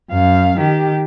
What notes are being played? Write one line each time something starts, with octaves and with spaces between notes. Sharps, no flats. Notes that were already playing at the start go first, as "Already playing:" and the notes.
F#2 F5
D#3 G4